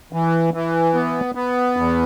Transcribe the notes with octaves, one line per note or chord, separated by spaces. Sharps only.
E3
E3
B3
B3
E2